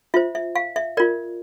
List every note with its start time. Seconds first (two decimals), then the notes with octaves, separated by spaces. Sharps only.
0.14 F4 C5 E5
0.35 E5
0.56 F5
0.76 E5
0.97 F4 A#4 D5